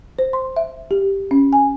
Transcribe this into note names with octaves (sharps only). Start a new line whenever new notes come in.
C5
C6
E5
G4
C#4
G#5